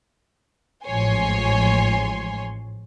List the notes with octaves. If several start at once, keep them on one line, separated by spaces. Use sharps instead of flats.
A1 G#2 F3 C#5 G#5 C6